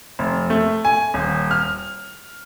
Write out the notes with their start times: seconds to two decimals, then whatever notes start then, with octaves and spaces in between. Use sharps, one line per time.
0.19 F1
0.50 A3
0.85 G#5
1.14 D#1
1.51 F6